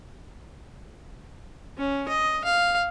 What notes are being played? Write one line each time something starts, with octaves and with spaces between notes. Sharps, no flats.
C#4
D#5
F5